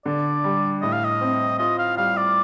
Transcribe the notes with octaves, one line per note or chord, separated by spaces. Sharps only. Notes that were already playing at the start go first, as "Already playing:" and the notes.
D3 D5
G3
A2 D#5
F5
D#5
C4
F4 D#5
F5
G3 F5
D5